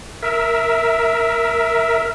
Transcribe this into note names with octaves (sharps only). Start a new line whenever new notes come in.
A#4 E5